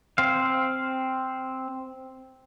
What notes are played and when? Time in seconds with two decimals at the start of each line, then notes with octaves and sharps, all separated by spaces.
0.18 C4 F5